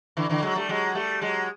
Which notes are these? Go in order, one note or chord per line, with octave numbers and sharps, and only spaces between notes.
D3 E3
D3 E3
F#3 G#3
G3 A3
F#3 G#3
G3 A3
F#3 G#3